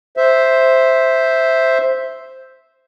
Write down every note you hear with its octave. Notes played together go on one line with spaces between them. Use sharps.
C5 E5